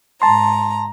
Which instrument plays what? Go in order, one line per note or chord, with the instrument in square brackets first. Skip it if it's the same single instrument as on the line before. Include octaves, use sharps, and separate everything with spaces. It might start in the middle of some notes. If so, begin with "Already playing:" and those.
[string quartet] G#2 A#5 [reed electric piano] A5 C6